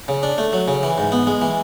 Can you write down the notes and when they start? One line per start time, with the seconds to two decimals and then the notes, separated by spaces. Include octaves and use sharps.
0.08 C#3
0.23 D4
0.38 A3
0.53 F#3
0.68 C#3
0.83 E3
0.98 G#2
1.12 B3
1.27 G#3
1.42 E3